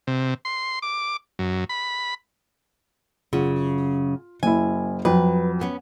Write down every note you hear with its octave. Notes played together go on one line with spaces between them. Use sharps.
C3
C6
D6
F#2
B5
F#2 C#3 F4
F#1 E4 G#5
F2 F#3 B4
B3 C#4